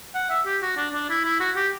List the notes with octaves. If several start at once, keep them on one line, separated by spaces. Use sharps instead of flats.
F#5
E5
G4
F#4
D4
D4
E4
E4
F#4
G4